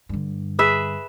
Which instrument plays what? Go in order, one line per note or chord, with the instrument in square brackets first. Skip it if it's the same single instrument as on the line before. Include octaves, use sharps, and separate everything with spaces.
[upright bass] G2 D3
[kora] G#4 B4 E5